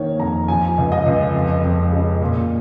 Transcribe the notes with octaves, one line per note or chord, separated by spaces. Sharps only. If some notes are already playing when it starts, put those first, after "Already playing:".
Already playing: D#3 A#3 C#5
F2 A#5
F3 G#5
C#2
D#5
C#2
F2
F2
C#3
A#2